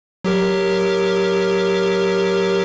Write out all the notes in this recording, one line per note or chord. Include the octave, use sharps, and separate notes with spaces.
F#3 G4 A#4